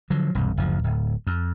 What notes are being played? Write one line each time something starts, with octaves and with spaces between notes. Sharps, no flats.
D3 F3 F#3
E1 C2 G2
F#1 D2 F3
D1
F2